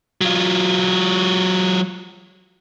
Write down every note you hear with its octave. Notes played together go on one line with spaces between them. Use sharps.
F#3 F4